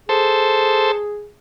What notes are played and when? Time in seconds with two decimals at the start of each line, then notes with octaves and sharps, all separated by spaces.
0.09 G#4 A4 C5